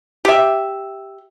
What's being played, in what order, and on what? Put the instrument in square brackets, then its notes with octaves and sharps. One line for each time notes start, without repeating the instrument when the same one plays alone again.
[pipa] G4 E5